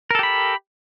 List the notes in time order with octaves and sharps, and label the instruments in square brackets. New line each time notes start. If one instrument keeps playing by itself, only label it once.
[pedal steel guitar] A#4
A4
G4
B5